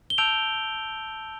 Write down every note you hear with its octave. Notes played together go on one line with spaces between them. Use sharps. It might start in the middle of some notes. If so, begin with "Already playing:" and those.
G7
A5 E6 G6 D7 F7